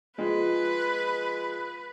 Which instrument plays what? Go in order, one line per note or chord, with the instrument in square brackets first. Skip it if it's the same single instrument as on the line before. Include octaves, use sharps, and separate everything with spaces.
[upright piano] F3 G#3 [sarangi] B4